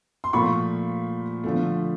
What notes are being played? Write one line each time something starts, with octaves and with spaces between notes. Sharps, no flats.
C6
A#2 F3 A3 B5 C#6
D3 F3 A3